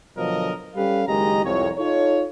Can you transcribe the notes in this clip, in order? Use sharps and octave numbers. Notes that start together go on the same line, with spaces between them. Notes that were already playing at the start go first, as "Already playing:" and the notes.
B2 D3 F3 F#3 A#4 D#5
G3 C#4 G4 A4 B4 F5
F#1 D#3 G#3 G4 D#5 A#5
C2 F2 C#5
D#4 F4 A4 C#5